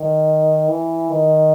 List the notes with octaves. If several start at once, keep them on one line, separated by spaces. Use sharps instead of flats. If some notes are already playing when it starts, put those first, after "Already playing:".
Already playing: D#3
E3
D#3